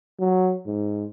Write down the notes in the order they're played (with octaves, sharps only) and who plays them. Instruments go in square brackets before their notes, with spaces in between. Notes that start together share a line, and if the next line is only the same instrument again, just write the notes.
[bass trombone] F#3
G#2